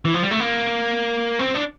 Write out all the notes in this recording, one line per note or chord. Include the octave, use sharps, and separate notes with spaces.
E3
F3
G3
A3
A#3
C4
D4